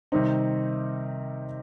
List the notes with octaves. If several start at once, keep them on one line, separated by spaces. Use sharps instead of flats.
C3 D#3 G3 C4 D#4